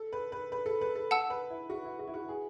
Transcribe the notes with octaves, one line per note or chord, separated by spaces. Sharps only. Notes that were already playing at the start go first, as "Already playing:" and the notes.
Already playing: A4
B4
B4
B4
A4
B4
A4
F#5 A5 E6
B4
E4
F#4
E4
F#4
E4
F#4
G#4